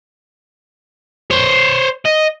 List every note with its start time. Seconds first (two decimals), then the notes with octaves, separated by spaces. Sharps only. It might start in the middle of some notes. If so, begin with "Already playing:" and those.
1.31 C5 C#5
2.06 D#5